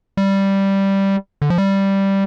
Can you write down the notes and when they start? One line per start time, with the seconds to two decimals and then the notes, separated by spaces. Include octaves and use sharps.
0.17 G3
1.42 D3
1.50 F3
1.58 G3